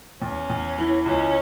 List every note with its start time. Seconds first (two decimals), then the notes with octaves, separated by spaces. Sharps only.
0.22 E2 C#4
0.50 E2
0.78 E3
1.05 C#2 C#4